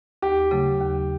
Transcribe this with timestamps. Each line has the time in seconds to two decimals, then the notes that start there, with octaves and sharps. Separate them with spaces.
0.22 D#2 G4
0.51 C#3 F#3 A3
0.81 D#2